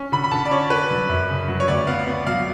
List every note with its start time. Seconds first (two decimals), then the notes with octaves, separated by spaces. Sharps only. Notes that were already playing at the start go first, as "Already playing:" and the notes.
Already playing: C#4
0.12 D3 B5
0.24 B5
0.31 D3 A5
0.45 D5
0.51 C#4 C#5
0.70 C#4 B4
0.91 F#3
1.09 F#2
1.29 C#3
1.48 F#3
1.60 C#5
1.68 D2 D5
1.87 B3 F5
2.07 B3
2.27 F#3 F5